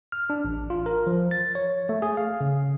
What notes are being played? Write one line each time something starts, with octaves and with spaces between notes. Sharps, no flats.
F6
D4
A1
F4
A#4
F3
A6
C#5
A3
G#4
F5
C#3